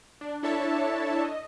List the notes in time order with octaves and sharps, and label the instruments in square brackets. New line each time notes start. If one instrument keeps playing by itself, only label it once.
[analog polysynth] D4
D4 E4 A4 C#5 E5 A5
D#5